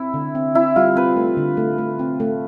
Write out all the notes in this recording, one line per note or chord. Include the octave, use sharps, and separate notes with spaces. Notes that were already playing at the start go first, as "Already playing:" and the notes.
Already playing: C4 E4
D3
C4
C4 E4
G3 F4
C4 B4
A3
D3
A3
A3
C4
A3